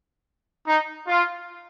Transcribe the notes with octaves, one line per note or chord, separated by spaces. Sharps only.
D#4
F4